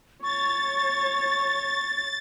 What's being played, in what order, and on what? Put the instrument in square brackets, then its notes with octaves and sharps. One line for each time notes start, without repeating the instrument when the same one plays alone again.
[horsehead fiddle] C#5 [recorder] C#6 [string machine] A6